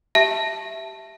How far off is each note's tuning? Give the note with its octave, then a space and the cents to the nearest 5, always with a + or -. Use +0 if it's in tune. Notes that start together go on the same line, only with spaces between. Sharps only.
G4 -10 E5 +0 A5 +0